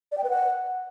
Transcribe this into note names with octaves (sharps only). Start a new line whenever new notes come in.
D5
G5
B4
F#5